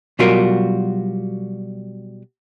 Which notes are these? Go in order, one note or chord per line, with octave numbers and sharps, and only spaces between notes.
B2 F#3 G3 F4 F#4 A#4